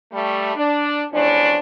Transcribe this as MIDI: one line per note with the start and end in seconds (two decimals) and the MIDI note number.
0.12 0.52 55
0.12 0.52 57
0.55 1.03 62
1.12 1.58 40
1.12 1.58 45
1.12 1.58 53
1.12 1.58 61
1.12 1.58 62